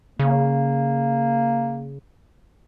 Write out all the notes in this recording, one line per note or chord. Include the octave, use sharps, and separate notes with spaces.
C#3 A#3